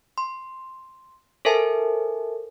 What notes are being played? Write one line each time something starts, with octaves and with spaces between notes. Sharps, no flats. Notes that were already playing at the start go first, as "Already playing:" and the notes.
C6
A4 A#4 C5 E5 G#5 A5